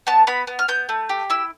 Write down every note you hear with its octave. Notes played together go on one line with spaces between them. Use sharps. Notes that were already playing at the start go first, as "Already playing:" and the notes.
B3 A5
B3 B5
B3
F6
B3 G6
A3
G4
E4 E6